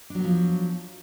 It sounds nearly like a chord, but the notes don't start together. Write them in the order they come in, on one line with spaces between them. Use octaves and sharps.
D4 F#3 B3 F3